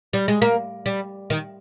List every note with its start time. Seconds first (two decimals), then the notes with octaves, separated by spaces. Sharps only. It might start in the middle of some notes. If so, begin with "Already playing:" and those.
0.13 G3
0.28 G#3
0.42 A#3
0.86 G3
1.30 D#3